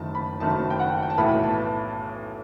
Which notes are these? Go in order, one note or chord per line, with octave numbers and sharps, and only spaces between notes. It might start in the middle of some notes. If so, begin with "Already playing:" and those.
Already playing: F#1 F#2 D#3 A3 A5
B5
F#1 F#2 D#3 A3 A5
G5
F#5
G5
A5
B1 A2 E3 B3 E4 B5
A5